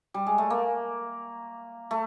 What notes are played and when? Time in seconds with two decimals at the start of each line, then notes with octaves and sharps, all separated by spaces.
0.14 G3
0.26 G#3
0.38 A3
0.50 A#3
1.91 A3